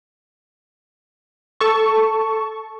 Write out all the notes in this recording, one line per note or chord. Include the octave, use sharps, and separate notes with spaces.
A4 A5 C#6